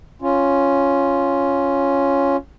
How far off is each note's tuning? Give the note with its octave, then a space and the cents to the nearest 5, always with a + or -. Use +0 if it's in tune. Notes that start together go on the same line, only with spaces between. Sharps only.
C#4 +0 F4 +0